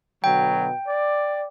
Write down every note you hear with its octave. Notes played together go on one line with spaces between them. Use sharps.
B2 D3 F#3 G5
D5